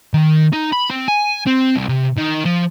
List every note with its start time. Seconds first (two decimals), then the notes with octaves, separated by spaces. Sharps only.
0.14 D#3
0.53 D#4
0.73 B5
0.90 C4
1.08 G#5
1.46 C4
1.76 C2
1.89 C3
2.17 D#3
2.45 F3